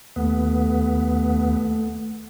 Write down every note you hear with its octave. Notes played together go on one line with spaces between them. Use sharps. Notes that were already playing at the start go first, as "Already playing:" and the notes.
D#2 A3 B3